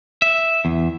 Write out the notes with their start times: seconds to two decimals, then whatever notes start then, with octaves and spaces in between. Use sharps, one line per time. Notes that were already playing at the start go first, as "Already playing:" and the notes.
0.22 E5
0.65 E2